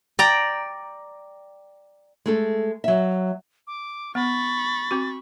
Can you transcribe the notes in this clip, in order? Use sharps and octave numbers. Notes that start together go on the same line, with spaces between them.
D5 G5 A#5
G#3 A3 A4
F#3 E5
D6
B3 B5 C#6 A6
C4 F#4